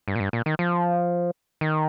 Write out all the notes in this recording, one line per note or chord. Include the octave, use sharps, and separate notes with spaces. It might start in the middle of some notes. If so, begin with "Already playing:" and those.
G2
A#2
G2
A#2
D#3
F3
D#3